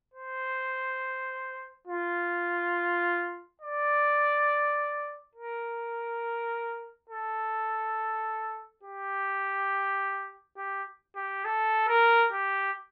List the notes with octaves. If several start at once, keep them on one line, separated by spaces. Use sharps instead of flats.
C5
F4
D5
A#4
A4
G4
G4
G4
A4
A#4
G4